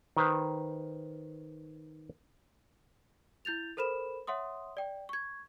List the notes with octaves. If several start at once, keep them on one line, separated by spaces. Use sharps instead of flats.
D#3 B4 C5
E4 G6 A6 F7
A4 A#4 C5 B5 E7
C#5 E5 F#5 C6 D#6
D5 G5
C#6 G#6